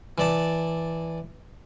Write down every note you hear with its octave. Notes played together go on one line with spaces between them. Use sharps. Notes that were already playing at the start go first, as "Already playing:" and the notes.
E3 D5 A5